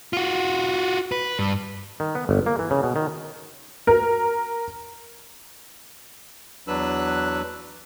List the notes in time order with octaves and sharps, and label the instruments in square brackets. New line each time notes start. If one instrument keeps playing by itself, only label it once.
[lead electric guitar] F4 F#4
B4
G2
[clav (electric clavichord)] D#3
B3
G1
A#3
E3
C#3
B2
D#3
[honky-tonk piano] A#4
[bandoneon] E2 F#3 D4 B4 E6 F#6